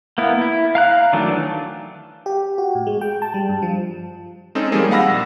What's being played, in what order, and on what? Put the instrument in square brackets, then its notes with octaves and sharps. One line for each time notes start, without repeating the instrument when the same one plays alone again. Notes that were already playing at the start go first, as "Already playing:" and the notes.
[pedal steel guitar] A#3 B3 E4
E4
F5 A#5 F#6
D#3 E3 F#3 A3 D4
[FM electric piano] G4
F#4
A2
G#3
G5
A5
G3
G2
F3
[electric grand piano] G#3 C4 C#4 D#4 G#4 A4
D#3 F3 G3 G#3 A#3 G#4
F5 F#5 B5 E6 A#6
A#1